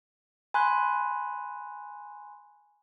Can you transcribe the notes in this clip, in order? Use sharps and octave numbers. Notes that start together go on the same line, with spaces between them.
G#5 B5 C6 F#6